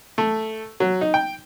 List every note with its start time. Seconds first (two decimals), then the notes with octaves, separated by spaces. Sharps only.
0.18 A3
0.80 F#3
1.01 D#4
1.14 G5